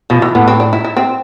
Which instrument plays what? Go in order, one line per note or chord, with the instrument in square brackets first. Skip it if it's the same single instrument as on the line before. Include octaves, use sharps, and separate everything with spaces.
[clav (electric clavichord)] B2 [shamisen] F3
[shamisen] E3
[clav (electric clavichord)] A2 [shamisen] B3
[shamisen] C4
D4
E4
E4
C4